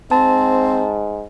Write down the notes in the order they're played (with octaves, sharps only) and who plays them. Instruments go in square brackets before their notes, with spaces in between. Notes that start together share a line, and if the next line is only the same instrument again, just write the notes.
[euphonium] G#2 [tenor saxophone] C4 [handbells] A5